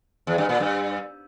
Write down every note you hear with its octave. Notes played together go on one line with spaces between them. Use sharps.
E2
G2
A#2
G2